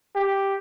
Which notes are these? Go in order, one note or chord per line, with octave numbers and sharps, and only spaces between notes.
G4